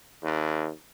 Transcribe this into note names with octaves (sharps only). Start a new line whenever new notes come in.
D#2